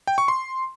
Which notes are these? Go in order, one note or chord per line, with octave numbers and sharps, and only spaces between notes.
G5
C#6
C6